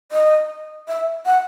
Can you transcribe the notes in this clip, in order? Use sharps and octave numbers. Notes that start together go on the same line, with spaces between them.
D#5
E5
F#5